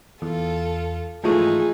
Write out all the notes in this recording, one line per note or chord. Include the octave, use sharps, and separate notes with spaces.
E2 F4 A4
G#2 E3 F3 G#3 A3 D#4 G#4 D#6